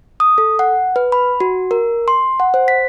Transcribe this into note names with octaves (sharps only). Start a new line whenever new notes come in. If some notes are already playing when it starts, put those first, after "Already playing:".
D#6
A4
F#5
B4
B5
F#4
A#4
C6
F#5
C5
B6